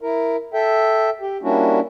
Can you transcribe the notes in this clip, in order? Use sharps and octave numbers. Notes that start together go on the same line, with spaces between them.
E4 A#4
A4 E5 G5
G4
G3 A#3 C#4 D4 E4 F#4